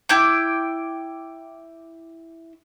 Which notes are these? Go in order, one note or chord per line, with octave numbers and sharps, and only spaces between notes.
E4 G5 D6